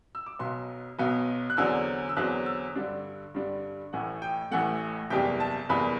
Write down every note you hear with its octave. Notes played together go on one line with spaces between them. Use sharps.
E6
D6
B1 B2 F#3 B3 C6
B1 B2 F#3 B3
F#6
E2 D3 F#3 C4 E6
E6
E2 D3 F#3 C4 F#6
E6
G2 D3 G3 D4
G2 D3 G3 D4
A1 A2 E3 A3 F#5
G5
A1 A2 E3 A3 F#5
F#1 E2 C3 G3 G5
A5
F#1 E2 C3 G3 B5